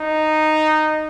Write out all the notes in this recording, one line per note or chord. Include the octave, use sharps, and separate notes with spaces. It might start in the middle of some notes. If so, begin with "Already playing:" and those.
Already playing: D#4